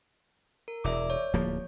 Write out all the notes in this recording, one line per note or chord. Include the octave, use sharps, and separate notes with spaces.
A#4
E1 D5 E5 D6
C#5
D1 F3 A#3